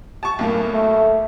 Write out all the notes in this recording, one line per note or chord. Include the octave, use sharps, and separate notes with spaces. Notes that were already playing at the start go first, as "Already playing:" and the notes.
A5 C#6
B1 A2 A#3
A3